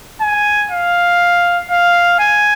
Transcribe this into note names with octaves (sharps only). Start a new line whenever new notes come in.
G#5
F5
F5
G#5